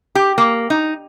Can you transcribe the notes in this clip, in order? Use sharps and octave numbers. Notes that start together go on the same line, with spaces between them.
G4
A#3
D#4